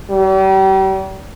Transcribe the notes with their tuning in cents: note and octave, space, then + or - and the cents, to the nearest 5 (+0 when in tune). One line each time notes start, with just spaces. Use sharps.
G3 -40